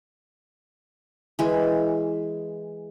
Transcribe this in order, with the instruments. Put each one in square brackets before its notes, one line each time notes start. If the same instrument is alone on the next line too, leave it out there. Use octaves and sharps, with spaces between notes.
[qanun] E3 G#3